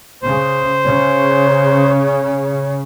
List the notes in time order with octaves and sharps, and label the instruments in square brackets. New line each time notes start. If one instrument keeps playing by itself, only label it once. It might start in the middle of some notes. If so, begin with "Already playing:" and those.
[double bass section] C#3 [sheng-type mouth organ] C5
[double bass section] C#3 [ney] C#5